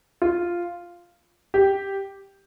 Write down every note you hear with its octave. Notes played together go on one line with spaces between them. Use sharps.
F4
G4